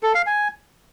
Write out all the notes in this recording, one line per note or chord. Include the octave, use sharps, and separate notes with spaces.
A4
F5
G#5